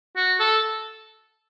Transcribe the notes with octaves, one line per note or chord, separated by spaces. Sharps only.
F#4
A4